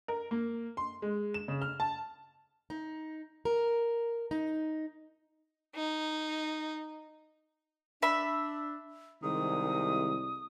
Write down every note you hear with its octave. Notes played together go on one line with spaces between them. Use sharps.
A#4
A#3
C6
G#3
E7
C#3
F6
A5
D#4
A#4
D#4
D#4
D4 E5 B5
C2 D#3 G#3 D#6